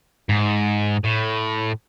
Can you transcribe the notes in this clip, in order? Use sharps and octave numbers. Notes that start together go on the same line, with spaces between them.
G#2
A2